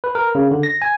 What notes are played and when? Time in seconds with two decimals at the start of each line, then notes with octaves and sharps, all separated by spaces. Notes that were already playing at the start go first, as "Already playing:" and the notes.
0.04 B4
0.15 A#4
0.35 C#3
0.51 D3
0.63 A#6
0.82 G#5